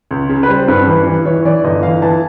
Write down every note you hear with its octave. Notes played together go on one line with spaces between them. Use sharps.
C#2
C#3
B4
G3 C5
G2 B4
E3 B4
E3
E3 C#5
E3 D5
G1 D#5
E3 F5
E3 A5